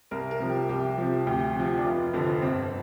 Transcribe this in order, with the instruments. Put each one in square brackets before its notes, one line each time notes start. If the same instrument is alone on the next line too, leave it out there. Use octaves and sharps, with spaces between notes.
[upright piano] C2 A#4
A#4
C3 F3
G4
C2 G4
C3 F3
D2 G4
C3 F3
D4
F1 F4
F2 D3 F3
G1 C4